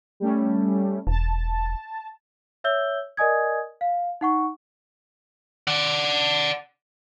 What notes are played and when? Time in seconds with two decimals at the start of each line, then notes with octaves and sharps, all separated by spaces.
0.20 G3 A3 C#4
1.07 E1 A5
2.64 C#5 E5 E6 G6 G7
3.17 A#4 D5 D#5 G#5 D#6 G#6
3.81 F5
4.21 D#4 F#5 C#6
5.68 D5 F#5